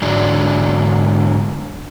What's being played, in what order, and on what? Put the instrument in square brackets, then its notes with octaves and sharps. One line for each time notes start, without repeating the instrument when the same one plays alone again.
[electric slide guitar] G#2 D3 F#3 G#3 D4